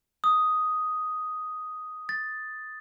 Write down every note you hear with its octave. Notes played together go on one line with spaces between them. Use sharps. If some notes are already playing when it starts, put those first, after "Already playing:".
D#6
A6